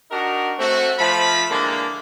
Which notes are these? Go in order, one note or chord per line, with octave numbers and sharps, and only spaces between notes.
D4 D#4 F#4 A#4
A3 C4 F#4
F3 A3 B5
D3 E3 G#3 A#3